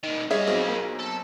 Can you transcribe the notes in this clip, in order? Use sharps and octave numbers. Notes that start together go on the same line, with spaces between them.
A#2 D#3
G3 F4 G#4 C#5 D#5 E5
B1 C4 G#4
A#3
A4